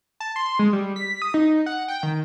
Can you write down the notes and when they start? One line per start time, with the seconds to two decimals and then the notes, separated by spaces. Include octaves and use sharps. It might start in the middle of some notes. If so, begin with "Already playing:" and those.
0.20 A5
0.36 C6
0.59 G#3
0.73 G3
0.96 B6
1.22 D#6
1.34 D#4
1.66 F#5
1.88 G5
2.03 D#3